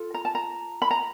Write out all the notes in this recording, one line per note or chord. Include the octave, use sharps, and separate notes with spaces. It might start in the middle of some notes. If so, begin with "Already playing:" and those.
Already playing: F4 A4
A#5
A5
A#5
B5
A#5